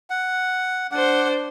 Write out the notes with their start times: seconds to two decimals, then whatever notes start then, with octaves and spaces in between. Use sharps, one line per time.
0.10 F#5
0.91 D4 C5 F#5